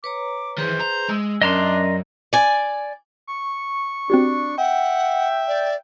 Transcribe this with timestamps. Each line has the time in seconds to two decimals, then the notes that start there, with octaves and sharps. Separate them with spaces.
0.04 B4 C#5 A#5 D6
0.58 D#3 E3 G#4 B4 C5
0.80 A#5
1.09 G#3 E6
1.42 F#2 C#4 D4 A#4 D5 D#5 A#5 C6
2.33 D5 G#5
3.27 C#6
4.10 C4 D4 F#4 G4
4.58 E5 F#5 G5
5.48 D5